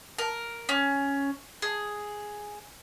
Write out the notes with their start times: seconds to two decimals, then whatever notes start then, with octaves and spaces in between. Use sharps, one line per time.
0.18 A#4
0.69 C#4
1.62 G#4